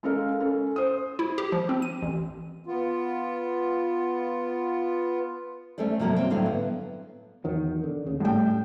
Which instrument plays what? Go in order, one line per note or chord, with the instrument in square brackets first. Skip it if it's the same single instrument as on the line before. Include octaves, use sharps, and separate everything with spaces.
[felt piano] G#3 C#4 A4 A#4 F5
C#4 A4
C5 D#6
[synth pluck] E4
G4
F3
C4
D#7
A1
[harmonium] B3 F4
[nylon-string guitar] A3 C#4 A4 C5 D5
C3 F3 F#3 A#3 F4
C4 C#4
A2 D3 F#3 C4 E4 F5
B3
[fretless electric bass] E2 D#3 F#3
D3
D#2 C#3
[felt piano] A2 G5 [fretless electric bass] G3